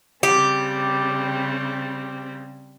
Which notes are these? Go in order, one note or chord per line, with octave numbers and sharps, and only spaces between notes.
C#3 G3 C4 G4